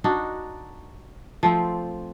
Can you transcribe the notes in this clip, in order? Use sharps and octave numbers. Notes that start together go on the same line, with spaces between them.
D4 D#4 F#4
F3 A3 C4